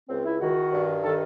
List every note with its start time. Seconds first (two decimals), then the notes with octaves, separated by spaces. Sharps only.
0.09 C#2 C4
0.25 E4
0.40 D#3 F#4
0.72 G2
1.02 D#3 A4